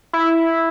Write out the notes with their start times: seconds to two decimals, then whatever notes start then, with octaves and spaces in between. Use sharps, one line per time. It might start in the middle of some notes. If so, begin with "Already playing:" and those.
0.13 E4